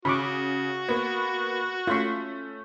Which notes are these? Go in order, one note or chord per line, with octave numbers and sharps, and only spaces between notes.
C#3 F#4 B5 C#6 D6
A#3 B3
A3 C#4 F4 C6 C#6 B6